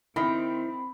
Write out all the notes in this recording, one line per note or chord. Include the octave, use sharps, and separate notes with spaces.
D#3 C4 E4 B5